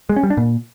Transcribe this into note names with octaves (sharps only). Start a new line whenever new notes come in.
G#3
C#4
G3
D4
A#2